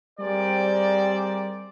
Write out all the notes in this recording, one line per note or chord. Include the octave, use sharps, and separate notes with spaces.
G3 C4 G#4 A#4 C5 D5